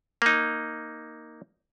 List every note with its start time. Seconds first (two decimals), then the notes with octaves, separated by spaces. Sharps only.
0.22 A#3 D#4